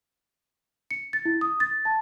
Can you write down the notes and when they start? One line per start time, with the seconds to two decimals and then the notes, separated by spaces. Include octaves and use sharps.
0.91 C#7
1.13 A6
1.25 E4
1.41 D#6
1.60 A6
1.85 A5